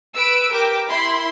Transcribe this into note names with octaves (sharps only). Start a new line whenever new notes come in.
B4 E6 D7
G4 A#4 G5 D6
E4 B5 C6